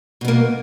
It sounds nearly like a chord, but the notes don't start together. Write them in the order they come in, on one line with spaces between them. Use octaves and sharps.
B2 B3 A#3